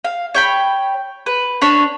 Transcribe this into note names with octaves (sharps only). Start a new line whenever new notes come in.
F5
C#5 G5 B5
B4
D4 C#5 B5